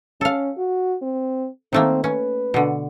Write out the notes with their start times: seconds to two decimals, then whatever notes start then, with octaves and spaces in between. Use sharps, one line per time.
0.21 C#4 A4 F5
0.58 F#4
1.02 C4
1.73 D#3 A3 A#3 C4
2.04 C#4 B4
2.54 B2 D3